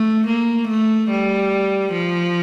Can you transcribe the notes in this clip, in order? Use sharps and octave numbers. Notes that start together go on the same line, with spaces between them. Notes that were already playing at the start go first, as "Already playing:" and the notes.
Already playing: A3
A#3
A3
G3
F3